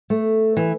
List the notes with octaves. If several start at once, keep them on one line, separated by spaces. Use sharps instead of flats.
A3
E3